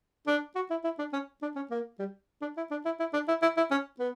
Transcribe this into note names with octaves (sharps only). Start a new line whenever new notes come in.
D4
F#4
E4
E4
D4
C#4
D4
C#4
A#3
G3
D4
E4
D4
E4
E4
D4
E4
E4
E4
C#4
B3